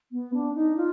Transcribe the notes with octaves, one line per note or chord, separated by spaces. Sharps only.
B3
D4
D#4
F4